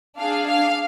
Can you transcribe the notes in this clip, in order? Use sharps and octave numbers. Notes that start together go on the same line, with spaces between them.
D4 G#4 F5
F5